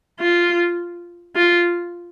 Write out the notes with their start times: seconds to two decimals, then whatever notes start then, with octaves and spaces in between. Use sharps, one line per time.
0.20 F4
1.36 F4